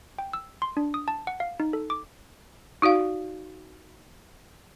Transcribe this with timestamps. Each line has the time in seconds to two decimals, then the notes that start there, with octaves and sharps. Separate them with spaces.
0.18 G5
0.33 E6
0.62 C6
0.77 D4
0.94 D#6
1.08 A5
1.27 F#5
1.40 F5
1.60 D#4
1.73 A4
1.90 D6
2.82 D#4 F#4 D5 F5